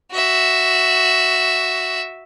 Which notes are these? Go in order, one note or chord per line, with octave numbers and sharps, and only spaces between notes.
F#4 E5